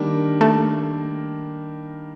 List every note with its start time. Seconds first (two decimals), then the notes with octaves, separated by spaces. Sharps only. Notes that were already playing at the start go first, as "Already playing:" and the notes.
Already playing: D#3 G3 A#3 D4
0.41 A3